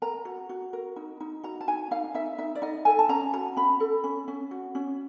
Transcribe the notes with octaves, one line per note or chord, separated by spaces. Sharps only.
A#4 A#5
F#4
F#4
A#4
D#4
D#4
F#4 A#5
A5
D#4 G#5
D#4 F5
D#4 E5
D#4 E5
D5
D#4 D#5
A4 G#5
A5
C#4 A#5
F#4 A#5
C#4 B5
A4
C#4
C#4
F#4
C#4